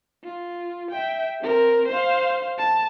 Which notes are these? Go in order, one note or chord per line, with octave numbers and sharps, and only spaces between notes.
F4
E5 G5
C4 A#4
C5 F5
A5